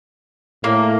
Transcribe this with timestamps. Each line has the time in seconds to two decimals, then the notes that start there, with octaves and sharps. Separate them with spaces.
0.64 A2 A#3